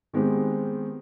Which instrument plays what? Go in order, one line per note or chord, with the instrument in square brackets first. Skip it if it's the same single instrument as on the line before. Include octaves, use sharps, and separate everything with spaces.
[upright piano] D#3 G#3 B3 C4 G4